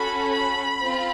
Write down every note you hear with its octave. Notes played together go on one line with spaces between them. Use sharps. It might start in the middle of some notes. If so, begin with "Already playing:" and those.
Already playing: C#4 F#4 A4 B5
B5
C4 F4